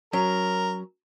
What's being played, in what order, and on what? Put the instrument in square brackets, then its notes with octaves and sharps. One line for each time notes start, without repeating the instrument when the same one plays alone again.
[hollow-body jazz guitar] F#3 C#4 [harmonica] A#4